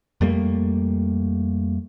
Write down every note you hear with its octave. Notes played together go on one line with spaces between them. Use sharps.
F2 G3 A3 A#3